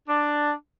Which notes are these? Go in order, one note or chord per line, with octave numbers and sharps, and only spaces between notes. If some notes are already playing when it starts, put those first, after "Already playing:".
D4